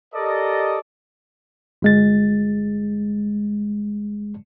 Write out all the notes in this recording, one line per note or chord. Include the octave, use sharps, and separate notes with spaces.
G4 A4 A#4 D5 D#5
G1 G#3 A6